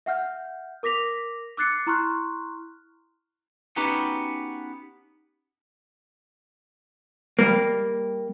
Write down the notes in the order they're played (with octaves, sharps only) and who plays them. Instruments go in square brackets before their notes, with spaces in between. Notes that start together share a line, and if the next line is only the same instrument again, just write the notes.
[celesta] E5 F#5 F6 G6
A#4 D6 A#6 B6 F7
D6 E6 F#6 A6 C7 C#7
E4 A#5 C6 C#6 F6 F#6
[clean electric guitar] B3 C#4 D#4 F#4 G4 B4
[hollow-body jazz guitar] G3 A#3